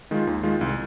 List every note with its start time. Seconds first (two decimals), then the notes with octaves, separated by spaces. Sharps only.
0.11 D#3 G#3 F4
0.27 D#2
0.43 D#3 G#3 F4
0.61 C2